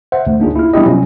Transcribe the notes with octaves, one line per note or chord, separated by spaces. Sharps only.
C5 E5 F#5
D2
A#3 D4 D#4 F4 G#4
E4 F4 F6
G3 B3 D4 E4 G4 D#5
C3 F#3 G3 C#4 F4